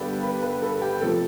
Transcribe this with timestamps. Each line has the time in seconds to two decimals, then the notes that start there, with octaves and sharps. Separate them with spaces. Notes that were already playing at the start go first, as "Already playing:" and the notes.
Already playing: G2 D3 G3 B3 G4 A4 B4
0.23 B4
0.43 B4
0.62 A4
0.82 G4
1.01 C3 F3 A3 C4 A4